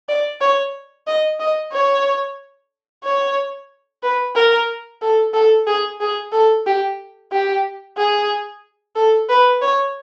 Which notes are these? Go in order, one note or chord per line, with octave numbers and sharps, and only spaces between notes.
D5
C#5
D#5
D#5
C#5
C#5
B4
A#4
A4
A4
G#4
G#4
A4
G4
G4
G#4
A4
B4
C#5